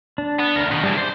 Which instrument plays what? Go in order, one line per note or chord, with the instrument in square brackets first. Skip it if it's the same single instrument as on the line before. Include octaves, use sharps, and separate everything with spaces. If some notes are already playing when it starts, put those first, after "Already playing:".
[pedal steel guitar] D4
[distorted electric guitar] B3
D2 A#4
B2 D#3
[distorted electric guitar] C2 E3 [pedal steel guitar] G3 D4 G#4
[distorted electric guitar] C5 [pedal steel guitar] D5